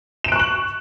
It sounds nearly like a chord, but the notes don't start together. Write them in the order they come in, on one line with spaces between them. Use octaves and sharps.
E7 D7 F#6 C#6 F#7